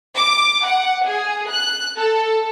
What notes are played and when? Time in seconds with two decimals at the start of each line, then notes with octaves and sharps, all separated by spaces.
0.16 D6
0.66 F#5
1.06 G#4
1.51 F#6
1.97 A4